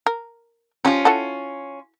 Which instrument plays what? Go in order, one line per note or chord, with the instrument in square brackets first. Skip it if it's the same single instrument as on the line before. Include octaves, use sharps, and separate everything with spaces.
[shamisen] A#4
[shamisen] F3 G4 C5 [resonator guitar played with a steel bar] C#4 F4
[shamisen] E4 F#4 A4